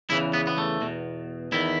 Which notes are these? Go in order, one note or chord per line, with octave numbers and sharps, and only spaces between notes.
E2 C#3 E3 E4
B3
B3
A3
E2 B2
E2 D#3 E4